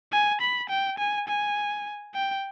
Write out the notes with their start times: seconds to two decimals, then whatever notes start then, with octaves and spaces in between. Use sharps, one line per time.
0.12 G#5
0.41 B5
0.69 G5
0.98 G#5
1.28 G#5
2.15 G5